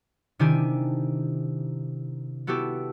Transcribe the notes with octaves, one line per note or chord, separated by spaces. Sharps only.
C3 D#3 D4 E4 G4 G#5
B3 E4 F#4 G4 A4